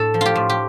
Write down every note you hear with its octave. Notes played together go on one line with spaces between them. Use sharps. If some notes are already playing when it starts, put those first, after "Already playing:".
Already playing: A2 A4
F3
F4 G4
A2
G4